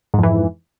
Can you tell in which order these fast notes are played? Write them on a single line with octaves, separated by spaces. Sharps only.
G#2 F2 E3